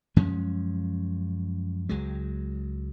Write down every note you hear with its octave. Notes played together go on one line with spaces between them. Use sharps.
F#2 F3 G#3 C#4
C#2 F#3 G#3